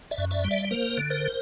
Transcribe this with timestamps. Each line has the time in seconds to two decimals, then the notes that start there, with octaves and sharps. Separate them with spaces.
0.11 D5 E5
0.18 F#2
0.31 D5 E5
0.44 G3
0.51 D5 E5
0.71 A#3 A#4 C5
0.98 D3
1.10 A#4 C5